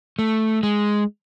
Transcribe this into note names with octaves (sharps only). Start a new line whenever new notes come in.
A3
G#3